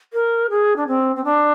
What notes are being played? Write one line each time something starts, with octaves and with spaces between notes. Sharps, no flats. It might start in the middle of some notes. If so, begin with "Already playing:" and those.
A#4
G#4
D4
C4
C4
D4